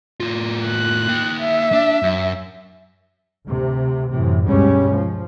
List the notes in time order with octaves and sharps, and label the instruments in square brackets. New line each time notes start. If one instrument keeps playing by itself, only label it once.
[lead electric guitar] A2 F4
[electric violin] F#6
[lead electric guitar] A#3 G5
[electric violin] E5
[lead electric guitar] D4
F#2
[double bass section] D2 C3
F#2 A2 C3 E3
D2 G2 B2 G3 G#3 C#4
F3